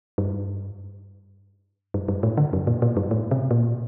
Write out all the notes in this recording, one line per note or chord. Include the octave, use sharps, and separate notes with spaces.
G2
G2
G2
A2
D3
F#2
A#2
A#2
G2
A2
C3
A#2